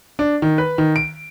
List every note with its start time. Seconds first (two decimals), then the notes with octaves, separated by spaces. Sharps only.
0.19 D4
0.42 D#3
0.58 B4
0.78 D#3
0.96 D7